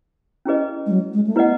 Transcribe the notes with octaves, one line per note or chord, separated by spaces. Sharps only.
C#4 E4 G#4 B4 D#5
G#3
F#3
G#3
A3
B3 E4 B4 D#5 F#5